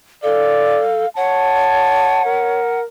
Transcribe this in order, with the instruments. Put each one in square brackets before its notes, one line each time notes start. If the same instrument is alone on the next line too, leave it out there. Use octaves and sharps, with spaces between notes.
[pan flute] A4 [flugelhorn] D5 [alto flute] F5
[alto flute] C#5 [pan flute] F#5 [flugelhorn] A5
[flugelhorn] A#4